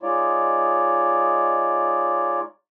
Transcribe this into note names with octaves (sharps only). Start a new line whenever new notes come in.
G#3 D#4 F4 C#5 D5